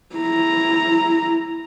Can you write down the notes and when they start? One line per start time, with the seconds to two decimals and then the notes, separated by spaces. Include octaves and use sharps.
0.15 E4 A#5